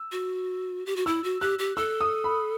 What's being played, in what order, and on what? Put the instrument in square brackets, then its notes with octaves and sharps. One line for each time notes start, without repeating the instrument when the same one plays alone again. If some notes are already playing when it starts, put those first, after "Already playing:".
Already playing: [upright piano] E6
[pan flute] F#4
G4
F#4
[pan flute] E4 [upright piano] E6
[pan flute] F#4
[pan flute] G4 [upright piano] F#6
[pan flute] G4
[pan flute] A4 [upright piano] E6
[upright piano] D#6
B5